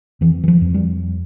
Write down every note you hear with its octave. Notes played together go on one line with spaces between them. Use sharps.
F2 E3
E3
F3
F2
G3